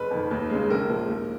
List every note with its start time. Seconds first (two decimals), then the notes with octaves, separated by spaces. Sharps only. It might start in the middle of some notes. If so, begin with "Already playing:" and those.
Already playing: F#1 B4
0.11 F2 D#3
0.31 D#2
0.50 C#3 G#3
0.69 A#1 A#4
0.89 A#2 F3 G#3
1.09 D#2